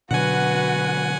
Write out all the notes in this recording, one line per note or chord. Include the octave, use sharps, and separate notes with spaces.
B2 D3 F#3 F#4 B4 F#5 G#5